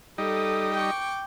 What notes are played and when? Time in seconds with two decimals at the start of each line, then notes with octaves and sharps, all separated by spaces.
0.18 G3 D#4 A4 D#6
0.74 G5 C#6 D6